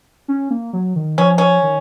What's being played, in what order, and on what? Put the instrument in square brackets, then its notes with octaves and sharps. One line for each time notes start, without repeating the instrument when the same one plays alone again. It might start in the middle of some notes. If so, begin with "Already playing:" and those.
[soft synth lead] C#4
A#3
F#3
D#3
[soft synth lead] F3 [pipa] C#4
[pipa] C#4
[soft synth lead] D#3